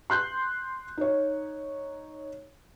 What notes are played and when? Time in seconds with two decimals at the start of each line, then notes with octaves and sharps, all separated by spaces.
0.10 C6 F#6 G6
0.98 D#4 C#5